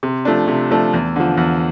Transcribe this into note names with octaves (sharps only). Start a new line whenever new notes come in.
C3
F3 A3 D4
C3
F3 A3 D4
E2
D3 F3
E2